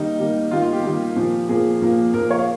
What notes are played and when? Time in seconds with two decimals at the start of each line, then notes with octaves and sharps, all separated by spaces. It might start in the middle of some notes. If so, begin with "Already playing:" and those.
Already playing: D#3 G3 A#3 D#4
0.18 D#3 G3 A#3
0.51 D#3 G3 A#3 F4
0.62 F4
0.73 G4
0.83 D#3 G3 A#3
1.16 A#2 F3 A#3
1.49 A#2 F3 A#3 G#4
1.82 A#2 F3 A#3
2.14 A#2 F3 A#3 A#4
2.31 C#5
2.38 F5